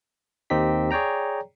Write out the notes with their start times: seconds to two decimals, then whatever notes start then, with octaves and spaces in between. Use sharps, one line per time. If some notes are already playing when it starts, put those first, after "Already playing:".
0.50 D#2 A#3 C4 D#4 G4 B6
0.91 G#4 C#5 D5 G5 A#5